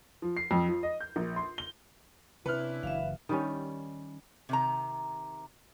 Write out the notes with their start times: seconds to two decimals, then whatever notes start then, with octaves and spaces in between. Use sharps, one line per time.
0.22 F3
0.37 C7
0.51 F2
0.69 F3
0.83 D#5
1.01 G6
1.16 A#1
1.36 C6
1.58 G7
2.46 C3 C#4 D4 E4 B4 F6
2.83 F#1 E3 E5 F5
3.29 D#3 G3 C#4
4.49 C3 D#3 A#5